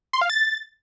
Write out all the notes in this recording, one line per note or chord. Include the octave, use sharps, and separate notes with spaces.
C6
F5
A6